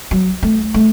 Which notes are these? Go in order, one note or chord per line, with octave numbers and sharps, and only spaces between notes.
F#3
A3
A3